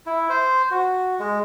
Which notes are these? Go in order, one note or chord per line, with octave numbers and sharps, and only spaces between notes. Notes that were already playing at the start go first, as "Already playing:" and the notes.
E4
C5
F#4
G#3